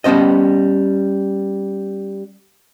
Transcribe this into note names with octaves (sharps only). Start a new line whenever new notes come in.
G3 B3 C#4 C5 D#5